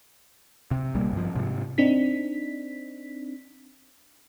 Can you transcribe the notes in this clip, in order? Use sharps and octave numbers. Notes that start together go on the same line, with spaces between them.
C3
A#1 A#2 G3 A#3
G2 F3
G#2 C3
C4 D4 D#4 B6